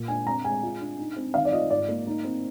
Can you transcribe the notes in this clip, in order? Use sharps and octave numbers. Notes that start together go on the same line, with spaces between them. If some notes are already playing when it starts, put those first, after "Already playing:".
Already playing: A#2
D4 G#5
C4 A#5
G#3 G#5
F4
D4
D#4
C4
D#3 F5
D5
F4 D#5
G#2 D5
A#3
D#4
C4